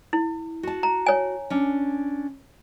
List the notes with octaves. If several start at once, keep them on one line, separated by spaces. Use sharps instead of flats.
E4
F#4 A5
A#5
C#5 G#5
C#4 D4